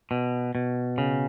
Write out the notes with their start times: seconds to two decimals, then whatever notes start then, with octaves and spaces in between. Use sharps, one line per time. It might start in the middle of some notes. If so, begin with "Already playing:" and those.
0.11 B2
0.55 B2
0.98 C#3